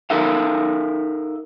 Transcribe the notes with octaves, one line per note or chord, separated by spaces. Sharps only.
D#4 A4 A#4 E5 F5